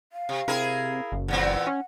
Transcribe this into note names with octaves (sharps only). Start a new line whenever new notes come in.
F5
C3
C3 E4 G#4 A#4
F#1
E2 A#2 C4 F#5
C#4